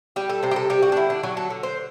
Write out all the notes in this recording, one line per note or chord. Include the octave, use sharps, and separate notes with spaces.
G3 G4
A4
C3 C5
G4
A4
G3 G4
F#4
D4
D3 E4
D4
F#3 F#4
A4
D3
C5